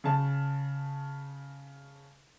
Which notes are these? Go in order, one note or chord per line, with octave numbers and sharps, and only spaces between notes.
C#3 A5